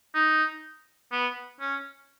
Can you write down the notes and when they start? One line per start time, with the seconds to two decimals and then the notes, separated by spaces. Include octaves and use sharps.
0.15 D#4
1.12 B3
1.61 C#4